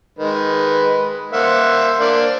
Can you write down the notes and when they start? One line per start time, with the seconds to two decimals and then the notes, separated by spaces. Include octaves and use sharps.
0.19 D#3 G#3 B4
1.33 A#3 C5 E5 F#5
2.00 A#3 D4